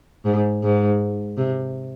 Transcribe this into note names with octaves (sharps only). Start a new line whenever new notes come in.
G#2
G#2
C3